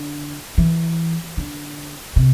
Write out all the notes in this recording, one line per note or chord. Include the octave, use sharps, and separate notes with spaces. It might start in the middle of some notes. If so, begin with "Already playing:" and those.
Already playing: D3
E3
D3
C3